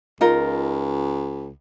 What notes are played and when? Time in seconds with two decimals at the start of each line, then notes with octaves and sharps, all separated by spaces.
0.21 C#2 D#4 F4 A#4